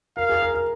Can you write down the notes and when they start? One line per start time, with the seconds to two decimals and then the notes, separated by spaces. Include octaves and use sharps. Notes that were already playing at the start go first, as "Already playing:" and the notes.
0.17 A#4 F5
0.29 G#4
0.43 A#4
0.55 A#4